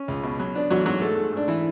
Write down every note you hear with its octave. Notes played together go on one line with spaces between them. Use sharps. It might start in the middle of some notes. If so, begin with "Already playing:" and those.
Already playing: C#4
C#2
B2
F#3
B3 D4
A1 F#3 F#4
G#2 F#3 F#4
G#3 A3 A4
G#2
G#2 D4
E3 E4